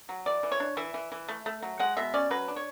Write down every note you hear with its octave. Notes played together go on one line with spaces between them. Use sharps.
F#3
E3 D5
E3
C#5
D4
E3 E5
E3
E3
A3
A3
F#3
G#3 F#5
B2 E5
C#4 D5
F#3 B4
D4
C#5